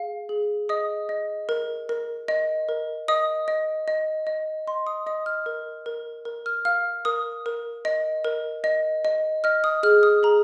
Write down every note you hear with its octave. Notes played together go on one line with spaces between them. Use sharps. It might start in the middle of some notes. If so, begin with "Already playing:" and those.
Already playing: G#4 F5
G#4
D#5 D#6
D#5
A#4
A#4
D#5
A#4
D#5 D#6
D#5
D#5
D#5
D#5 C6
D#6
D#5 D#6
F6
A#4
A#4
A#4
F6
F5 F6
A#4 D#6
A#4
D#5
A#4
D#5
D#5
D#5 F6
D#6
G#4 F6
D#6
G#4 A#5